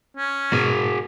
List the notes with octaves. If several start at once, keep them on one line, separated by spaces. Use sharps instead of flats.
C#4
G#2 B2 F#4 G#4